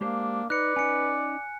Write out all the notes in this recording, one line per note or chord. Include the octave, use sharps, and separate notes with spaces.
G#3 A#3 D4 G4 C5
D#4 B4 D5 F#6 C#7
C#4 D#4 G#5 C#7